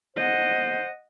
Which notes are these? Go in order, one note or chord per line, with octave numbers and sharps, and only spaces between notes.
C5 D#5 F#5